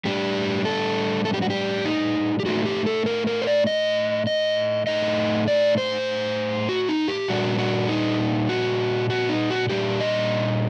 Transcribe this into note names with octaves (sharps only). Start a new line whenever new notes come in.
A2 G3 D4 G4
A4
A4
G4
F#4
G4
D#4
G4
A2 A3 D#4 F#4
G4
A4
A#4
A#4
C5
D5
D#5
D#5
A2 A3 D#4 D#5
D5
C5
F#4
D#4
G4
A#2 G3 D4 F#4
F#4
D#4
F#4
F#4
D#4
F#4
A#2 G3 D4 G4
D#5